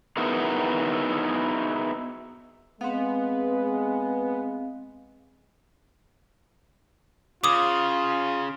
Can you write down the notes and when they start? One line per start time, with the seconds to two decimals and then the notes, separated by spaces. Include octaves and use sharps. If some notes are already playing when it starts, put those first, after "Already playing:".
0.17 B3 D#4 E4 F#4 G#4 A#4
2.81 G#3 B3 C4 F5
7.44 C#3 F4 D6 D#6